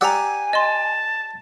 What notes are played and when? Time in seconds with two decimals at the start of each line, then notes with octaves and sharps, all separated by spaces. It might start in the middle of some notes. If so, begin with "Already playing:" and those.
0.01 G4 D5 F#5 G#5 A#5 E6
0.53 D#5 A5 C6